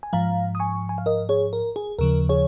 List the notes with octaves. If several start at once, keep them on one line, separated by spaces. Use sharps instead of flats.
G#5
G#2 F3 F5 A#5
D#6
G#5 C#6
G#5
F5
A#4 D#5
G#4 C#5
A#4
G#4
D#2 C#3 F3 A#4
G#4 C#5